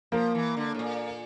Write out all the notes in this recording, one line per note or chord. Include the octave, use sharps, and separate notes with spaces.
F3 A#3
E3
D3
A2
A#2